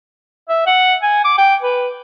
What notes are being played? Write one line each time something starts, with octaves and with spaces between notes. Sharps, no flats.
E5
F#5
G#5
D6
G5
B4